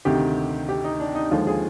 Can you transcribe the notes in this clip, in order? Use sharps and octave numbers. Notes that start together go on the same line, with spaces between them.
D2 C3 D#3 G4
G4
D#4
D4
D#4
D#2 D3 F3 G#3 F4
G#4